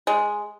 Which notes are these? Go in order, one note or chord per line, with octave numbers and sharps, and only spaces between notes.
G#3